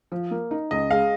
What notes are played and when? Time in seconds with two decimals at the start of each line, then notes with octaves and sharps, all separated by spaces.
0.12 F3
0.31 A#3
0.51 D#4
0.71 C#2 D#5
0.90 G#3 F5